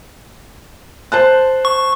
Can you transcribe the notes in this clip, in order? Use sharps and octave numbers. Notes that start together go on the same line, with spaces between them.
C5 A5 F#6
C#6